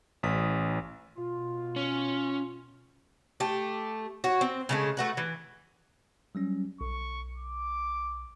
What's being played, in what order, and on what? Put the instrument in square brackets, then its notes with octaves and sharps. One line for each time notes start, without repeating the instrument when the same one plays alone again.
[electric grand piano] A1 D#6 B6
[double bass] B2 [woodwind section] F4
[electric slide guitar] C#4
[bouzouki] A3 G4
F#4 C#5
C4
C#3 G#3 A3
A3 F#4 B4
E3
[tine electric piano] F#3 G3 C#4
[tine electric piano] B1 [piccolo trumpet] C#6
[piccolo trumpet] D6